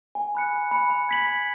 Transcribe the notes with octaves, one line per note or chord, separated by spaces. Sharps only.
G#5
B5 F#6 C#7
G#5
B5 F#6 C#7
B5
G#6 B6 F#7
B5